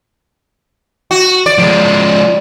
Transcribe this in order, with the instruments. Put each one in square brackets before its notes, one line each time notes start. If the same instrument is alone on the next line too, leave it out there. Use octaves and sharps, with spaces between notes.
[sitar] F#4
D5
[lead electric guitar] F3 G#3